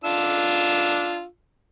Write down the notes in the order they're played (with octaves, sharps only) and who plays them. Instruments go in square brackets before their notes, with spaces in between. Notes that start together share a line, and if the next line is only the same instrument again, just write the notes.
[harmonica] D4 F4 E6